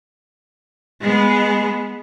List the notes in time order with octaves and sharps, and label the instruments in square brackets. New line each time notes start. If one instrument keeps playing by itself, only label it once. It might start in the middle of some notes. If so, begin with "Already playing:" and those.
[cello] G#3 B3